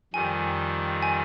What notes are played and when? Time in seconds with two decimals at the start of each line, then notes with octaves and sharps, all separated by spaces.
0.13 F2 D#3 G3 G#5
1.02 G#5